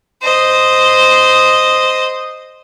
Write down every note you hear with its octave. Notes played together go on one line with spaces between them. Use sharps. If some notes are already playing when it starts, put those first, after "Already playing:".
C5 D#5